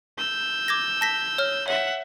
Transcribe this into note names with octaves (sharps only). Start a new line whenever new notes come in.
E6 G6
D6 G#6 A#6
A5 A#6 B6
C#5 F6
C#5 E5 F#5